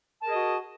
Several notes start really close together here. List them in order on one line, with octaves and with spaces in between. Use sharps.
A5 A#4 G#4 D#5 F#4